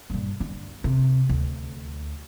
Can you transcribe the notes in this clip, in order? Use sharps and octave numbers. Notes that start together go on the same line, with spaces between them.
G2 A#2
D3
C3
D2